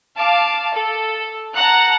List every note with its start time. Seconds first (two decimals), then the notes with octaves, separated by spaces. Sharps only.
0.17 F5 A5 D6
0.75 A4
1.55 F#5 A5 A#5 F#6